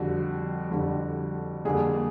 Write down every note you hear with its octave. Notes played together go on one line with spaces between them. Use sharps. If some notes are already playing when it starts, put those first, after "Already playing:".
Already playing: F2 D3 G3 F#4
F2 D3 G3
F2 D3 G3 A#3 G#4